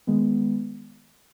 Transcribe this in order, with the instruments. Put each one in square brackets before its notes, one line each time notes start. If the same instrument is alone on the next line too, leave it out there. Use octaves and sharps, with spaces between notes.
[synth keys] D#3 G#3 B3